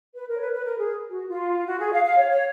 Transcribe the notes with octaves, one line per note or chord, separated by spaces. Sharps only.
B4
A#4
C#5
B4
B4
A#4
G#4
F#4
F4
F#4
G#4
F5
F5
C#5
C#5